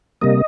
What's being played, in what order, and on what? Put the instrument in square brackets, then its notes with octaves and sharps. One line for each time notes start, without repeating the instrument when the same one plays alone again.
[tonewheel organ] C3 G3 A#3 D#5